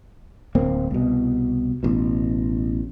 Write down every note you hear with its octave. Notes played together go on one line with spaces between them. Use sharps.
D1 A#3 C4
C2 B2
A1 B2